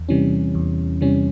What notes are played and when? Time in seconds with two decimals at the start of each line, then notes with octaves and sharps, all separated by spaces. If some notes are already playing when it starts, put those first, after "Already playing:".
Already playing: E2
0.09 C3 E3 G3 C#4
0.55 E2
1.01 C3 E3 G3 C#4